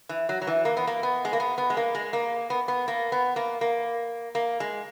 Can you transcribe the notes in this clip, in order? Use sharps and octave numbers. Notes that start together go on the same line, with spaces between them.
E3
F#3
F#3
E3
A#3
B3
A#3
B3
G#3
A#3
B3
B3
G#3
A#3
G#3
A#3
B3
B3
A#3
B3
A#3
A#3
A#3
G#3